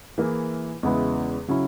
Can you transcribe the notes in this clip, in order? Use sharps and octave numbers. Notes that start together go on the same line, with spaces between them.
E3 A#3 E4 G#4
E2 C#3 G#3 B3 E4
C#3 F#3 C#4 E4